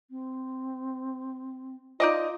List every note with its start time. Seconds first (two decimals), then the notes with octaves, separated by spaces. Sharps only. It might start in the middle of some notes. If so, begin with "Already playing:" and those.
0.11 C4
2.00 D#4 F4 D5 D#5